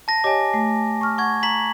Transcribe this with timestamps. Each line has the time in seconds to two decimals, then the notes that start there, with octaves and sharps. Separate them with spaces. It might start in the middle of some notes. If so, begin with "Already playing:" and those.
0.08 A5 A#6
0.24 G4 C#5 D#5 G#5 D6
0.54 A3
1.01 C#6 F6
1.18 F#5 C#6 G#6
1.43 A#5 B6 F#7